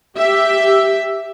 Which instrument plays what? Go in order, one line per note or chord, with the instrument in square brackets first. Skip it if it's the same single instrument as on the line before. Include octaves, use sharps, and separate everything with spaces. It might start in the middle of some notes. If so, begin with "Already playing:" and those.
[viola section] G4 E5